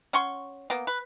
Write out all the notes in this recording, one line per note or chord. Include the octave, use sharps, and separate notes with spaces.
C#4 F#5 C6 C#6
A#3 B3
B4